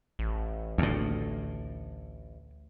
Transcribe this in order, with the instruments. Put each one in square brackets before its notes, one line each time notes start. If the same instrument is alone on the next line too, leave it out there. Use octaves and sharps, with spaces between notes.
[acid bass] A1
[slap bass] D2 A2